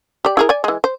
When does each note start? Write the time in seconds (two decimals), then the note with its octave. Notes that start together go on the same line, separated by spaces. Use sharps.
0.25 G4 D5
0.37 E4 G#4 A#4
0.49 D5 G#5
0.64 E3 G#3
0.84 C5